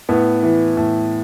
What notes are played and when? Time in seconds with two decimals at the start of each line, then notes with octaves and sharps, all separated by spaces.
0.09 A2 B3
0.43 E3
0.77 A2